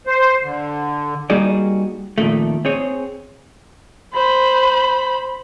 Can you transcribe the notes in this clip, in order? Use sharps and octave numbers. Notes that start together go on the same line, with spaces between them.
C5
D3
G3 A#3 D#4 F#4 G#4 D5
F2 A#2 D#3 A3
C4 G#4 C#5
C5 B5